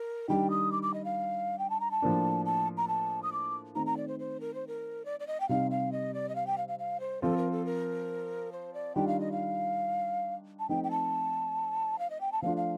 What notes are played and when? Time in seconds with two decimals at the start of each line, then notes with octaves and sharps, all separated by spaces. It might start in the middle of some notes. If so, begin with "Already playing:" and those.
Already playing: A#4
0.28 D#3 G3 D4 G5
0.50 D#6
0.72 D6
0.83 D6
0.94 D#5
1.05 F5
1.59 G5
1.70 A5
1.80 A#5
1.91 A5
2.02 A2 F3 A#3 D4
2.45 A5
2.77 A#5
2.88 A5
3.23 D#6
3.33 D6
3.75 D#3 A3 C4 A#5
3.86 A#5
3.97 D5
4.08 C5
4.19 C5
4.40 A#4
4.54 C5
4.67 A#4
5.05 D5
5.20 D5
5.27 D#5
5.40 G5
5.49 C3 G3 C4 D#4 F5
5.71 F5
5.92 D#5
6.14 D5
6.29 D#5
6.35 F5
6.47 G5
6.57 F5
6.68 F5
6.79 F5
7.00 C5
7.22 F3 C4 F4 A4
7.37 A#4
7.51 A4
7.65 A#4
8.52 C5
8.74 D5
8.95 D#3 G3 D4 F4 G5
9.07 F5
9.20 D#5
9.32 F5
10.59 A5
10.69 F3 A3 C4 D#4 G5
10.84 G5
10.91 A5
11.99 F5
12.10 D#5
12.21 G5
12.32 A5
12.42 F3 A3 D4 F4 F5
12.57 F5